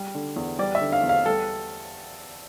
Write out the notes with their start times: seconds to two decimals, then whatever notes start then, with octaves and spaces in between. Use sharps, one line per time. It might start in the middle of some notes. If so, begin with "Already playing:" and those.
Already playing: G3
0.15 D3
0.36 E2
0.59 G3 D5
0.75 E5
0.81 D3
0.92 F5
1.03 E2
1.09 F5
1.25 G3 A4